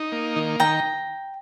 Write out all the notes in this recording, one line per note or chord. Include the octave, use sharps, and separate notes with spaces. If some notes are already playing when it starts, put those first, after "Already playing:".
Already playing: D#4
A#3
D#3
D#3 G5 A#5